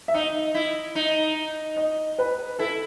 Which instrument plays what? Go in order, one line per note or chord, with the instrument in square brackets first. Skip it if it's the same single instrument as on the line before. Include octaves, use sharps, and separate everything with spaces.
[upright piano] E5
[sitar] D#4 [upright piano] D#5
[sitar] E4
D#4
[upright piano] D#5
B4
[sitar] E4 [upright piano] A4